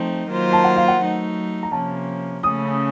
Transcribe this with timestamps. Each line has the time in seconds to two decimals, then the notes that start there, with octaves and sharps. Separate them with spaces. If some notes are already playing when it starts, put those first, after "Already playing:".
Already playing: F3 A3 C4 D#4
0.28 D#3 F#3 A#3 F4 C5
0.53 A5
0.64 F#5
0.76 F5
0.88 F#5
1.00 F#3 A3 D#4
1.63 A#5
1.72 C3 F3 A#3 C#4 A5
2.43 C#3 A3 C#4 D#6